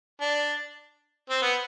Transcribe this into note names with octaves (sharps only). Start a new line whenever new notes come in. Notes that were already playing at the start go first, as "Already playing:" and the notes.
D4
C4
B3